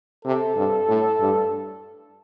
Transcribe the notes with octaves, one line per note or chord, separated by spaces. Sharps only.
C3 A4
G2
A2
G2